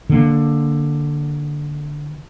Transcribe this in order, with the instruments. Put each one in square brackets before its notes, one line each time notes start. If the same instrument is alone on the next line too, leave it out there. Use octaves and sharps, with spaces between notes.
[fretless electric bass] D3 A#3